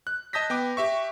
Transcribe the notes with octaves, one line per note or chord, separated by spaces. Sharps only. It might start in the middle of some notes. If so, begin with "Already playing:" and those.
F#6
D#5 A5 D#6 G6 A#6 B6
B3 G5 D6
G4 E5 C#6